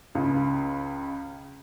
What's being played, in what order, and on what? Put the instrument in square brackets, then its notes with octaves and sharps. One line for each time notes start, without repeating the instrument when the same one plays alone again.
[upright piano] C#2 C#3